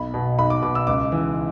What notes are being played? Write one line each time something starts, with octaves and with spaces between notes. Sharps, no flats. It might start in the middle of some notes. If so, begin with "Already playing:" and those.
Already playing: B1 B5
B2
B1 B5
D6
B2 D6
E6
C#2 D6
C#3 E3